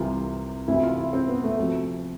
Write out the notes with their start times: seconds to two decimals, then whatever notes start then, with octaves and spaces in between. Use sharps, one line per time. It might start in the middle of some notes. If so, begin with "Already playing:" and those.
Already playing: C2 C3 E3 F4
0.68 D2 C3 E3 E4
0.83 F4
0.98 E4
1.13 C4
1.29 B3
1.43 A3
1.58 D2 C3 F3